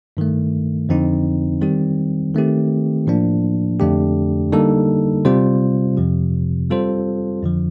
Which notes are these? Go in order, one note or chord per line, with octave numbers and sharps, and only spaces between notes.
G2 D#3 A3
F2 D3 F3 C4 D#4
D#3 G3 C4 G4
D#3 A3 C4 G4
A2 F3 A#3 D4
F2 D3 A3 D4 G4
D3 G3 A#3 D#4 A4
C3 G3 C4 F4 C5
F2 C3 F3
G3 C4 F4 A4 C5
F2 D3 F3